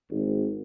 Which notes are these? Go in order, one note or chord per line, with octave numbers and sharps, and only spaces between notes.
G#1